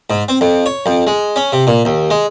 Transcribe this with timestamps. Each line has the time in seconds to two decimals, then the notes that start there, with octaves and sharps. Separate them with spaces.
0.10 G#2
0.28 C4
0.41 F2
0.66 C#5
0.86 F2
1.07 G#3
1.36 C#4
1.52 C3
1.67 A#2
1.85 D#2
2.10 G#3